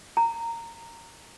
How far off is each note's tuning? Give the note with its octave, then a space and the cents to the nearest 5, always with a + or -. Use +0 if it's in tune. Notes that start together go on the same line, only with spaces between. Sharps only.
A#5 -15